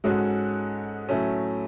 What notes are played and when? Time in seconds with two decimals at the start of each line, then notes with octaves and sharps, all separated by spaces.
0.04 G#2 G#3 C#4 F#4 A4
1.09 A2 F#3 A3 C#4